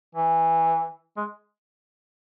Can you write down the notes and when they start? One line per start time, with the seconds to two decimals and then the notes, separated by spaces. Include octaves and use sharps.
0.15 E3
1.17 G#3